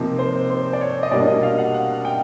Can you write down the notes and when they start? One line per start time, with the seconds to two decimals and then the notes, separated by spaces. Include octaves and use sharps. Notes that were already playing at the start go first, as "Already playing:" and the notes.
Already playing: C3 F3 A#3 D#4
0.19 C5
0.50 C5
0.73 D5
0.81 C#5
1.03 D#5
1.11 B2 G3 A#3 D4 D5
1.28 D#5
1.43 F5
1.59 F#5
1.74 F#5
2.05 G5